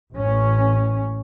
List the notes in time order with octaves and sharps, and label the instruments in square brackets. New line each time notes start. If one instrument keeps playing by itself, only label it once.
[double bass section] A1 C#4